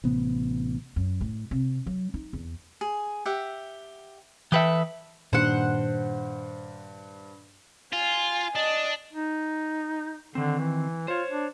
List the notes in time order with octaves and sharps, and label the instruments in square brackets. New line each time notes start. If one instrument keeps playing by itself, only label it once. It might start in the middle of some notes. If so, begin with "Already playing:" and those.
[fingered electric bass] A1 C3 B3
[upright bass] F#2
A2
C3
F#3
D#4
E2
[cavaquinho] G#4
G4 E5 F#5
[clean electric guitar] E3 B4 E5 [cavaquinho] A4 G5 D#6
[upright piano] G2 [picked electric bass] A#2 D#3 [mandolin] C5 F#5
[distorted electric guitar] F4 [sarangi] G#5
[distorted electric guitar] D4 [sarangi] D#5
[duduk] D#4
[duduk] D3 [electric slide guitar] D#3 C4
[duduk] E3
[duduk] F4 [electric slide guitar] C5 C#5
[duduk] D4